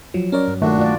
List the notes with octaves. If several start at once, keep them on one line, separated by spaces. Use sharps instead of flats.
F3 F#3
C#4 A#4 C#5 D5
G2
A#2 D#3 A3 D4 F#4
F4 D5